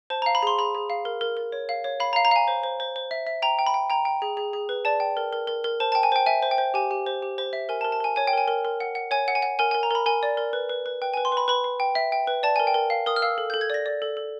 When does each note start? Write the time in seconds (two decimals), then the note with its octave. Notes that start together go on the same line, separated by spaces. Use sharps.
0.10 C5 A5
0.22 F5 A#5
0.35 B5
0.43 G#4 C6
0.58 G#4 B5
0.75 G#4
0.90 F5
1.05 A#4
1.21 A#4
1.37 A#4
1.52 C#5
1.69 F5
1.84 C#5
2.00 F5 B5
2.13 A#5
2.16 F5
2.25 A#5
2.31 F5 G#5
2.48 C5
2.64 C5
2.80 C5
2.96 C5
3.11 E5
3.27 E5
3.42 G5 A#5
3.59 G5
3.67 B5
3.74 G5
3.90 G5 A#5
4.05 G5
4.22 G#4
4.37 G#4
4.53 G#4
4.69 B4
4.85 D5 A5
5.00 G5
5.17 A#4
5.33 A#4
5.47 A#4
5.64 A#4
5.80 C5 A5
5.92 G5 A5
6.03 G#5
6.12 C5 G5
6.26 E5 G#5
6.43 C5
6.51 G5
6.58 C5
6.74 G4 G#5
6.91 G4
7.06 C5
7.22 G4
7.38 C5
7.53 E5
7.69 A#4 G#5
7.81 A5
7.84 A#4
7.92 A5
8.00 A#4 G#5
8.16 C#5 G#5
8.27 G5
8.33 A#4 G#5
8.48 A#4
8.65 A#4
8.80 F#5
8.95 F#5
9.11 C#5 G#5
9.28 F#5
9.35 G#5
9.42 F#5
9.59 A#4 G#5
9.71 A#4 G#5
9.83 A#5
9.91 A#4 B5
10.06 A#4 G#5
10.23 D5
10.37 A#4
10.53 B4
10.69 B4
10.86 B4
11.02 B4 G5
11.14 B4 G#5
11.25 C6
11.32 B4 B5
11.48 B4 B5
11.64 B4
11.80 G5
11.95 E5
12.12 G5
12.27 B4
12.43 D5 A5
12.56 A#4 G#5
12.67 G5
12.74 A#4
12.90 F5
13.06 A#4 D#6
13.16 F6
13.22 F5 E6
13.38 A4
13.50 A4 G6
13.61 G#6
13.70 D5 A#6
13.86 D5
14.02 A4
14.17 A4